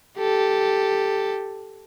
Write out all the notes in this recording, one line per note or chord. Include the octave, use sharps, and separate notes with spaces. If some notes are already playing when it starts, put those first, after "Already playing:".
G4 A4